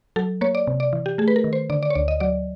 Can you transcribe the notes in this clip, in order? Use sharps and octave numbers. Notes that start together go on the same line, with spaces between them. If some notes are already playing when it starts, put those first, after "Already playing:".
F#3 A4
A#3 C#5
D5
C3
D5
E3
G4
A3 G#4
B4
A#4
D#3
C5
D3 D5
D5
C#5
D2 D5
D#5
F#3 D5